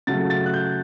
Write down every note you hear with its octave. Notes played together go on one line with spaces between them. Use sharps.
C#3 F#3 A3 A6
A6
F#6
G6